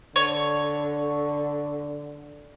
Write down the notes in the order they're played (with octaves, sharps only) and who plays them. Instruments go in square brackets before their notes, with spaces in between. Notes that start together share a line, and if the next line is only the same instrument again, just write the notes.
[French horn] D3 [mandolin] C#5